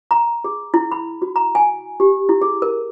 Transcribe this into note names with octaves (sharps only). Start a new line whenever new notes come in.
A#5
G#4
E4
B5
F#4
A#5
G#5
G4
E4
G#4
A#4